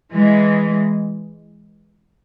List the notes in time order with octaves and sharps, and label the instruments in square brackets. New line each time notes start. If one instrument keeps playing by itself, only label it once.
[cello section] E3 G#3